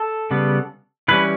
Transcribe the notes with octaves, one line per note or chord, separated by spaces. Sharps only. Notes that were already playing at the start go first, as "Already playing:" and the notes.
Already playing: A4
C#3 G3 B3
E3 G3 C#4 B4